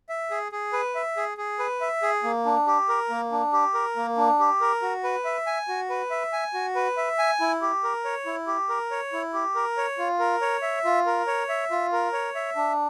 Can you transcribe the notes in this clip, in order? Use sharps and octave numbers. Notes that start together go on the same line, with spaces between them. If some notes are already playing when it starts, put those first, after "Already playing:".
E5
G#4
G#4
B4
E5
G#4
G#4
B4
E5
G#4
A#3
D4
G4
A#4
A#3
D4
G4
A#4
A#3
D4
G4
A#4
F#4
B4
E5
G#5
F#4
B4
E5
G#5
F#4
B4
E5
G#5
E4
G4
A#4
C#5
E4
G4
A#4
C#5
E4
G4
A#4
C#5
F4
A#4
C#5
E5
F4
A#4
C#5
E5
F4
A#4
C#5
E5
D4